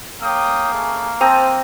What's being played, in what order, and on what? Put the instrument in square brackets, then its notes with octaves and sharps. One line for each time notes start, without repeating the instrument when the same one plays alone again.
[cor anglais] A#3 [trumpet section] C#4 G5 D#6
[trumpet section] A3 C#4 G#4
[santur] C4 A#5 D#6 [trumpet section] C5 A5